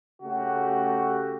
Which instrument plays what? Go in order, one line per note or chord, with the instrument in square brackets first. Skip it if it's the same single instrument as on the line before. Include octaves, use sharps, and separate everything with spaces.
[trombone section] C#3 A3 F#4 G4